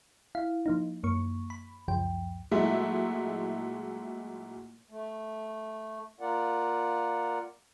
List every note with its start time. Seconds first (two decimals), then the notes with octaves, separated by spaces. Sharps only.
0.35 E4 F5
0.66 F3 A#3 D#4
1.03 F#2 A#3 C#6
1.50 B5
1.88 C#2 F#2 F3 G5
2.51 A#2 F#3 G#3 A3 E4
4.90 A3
6.21 A#3 F4 A#4 D5 F#5